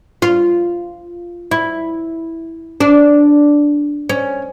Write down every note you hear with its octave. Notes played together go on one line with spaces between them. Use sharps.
F4
E4
D4
C#4